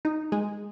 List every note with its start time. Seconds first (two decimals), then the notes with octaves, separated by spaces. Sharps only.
0.05 D#4
0.32 G#3